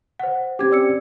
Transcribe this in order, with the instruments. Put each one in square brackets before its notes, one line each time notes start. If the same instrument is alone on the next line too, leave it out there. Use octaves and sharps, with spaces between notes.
[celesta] C5 F#5
[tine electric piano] C4 C#4 G4 [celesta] D6 G#6
[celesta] D5 E6 C#7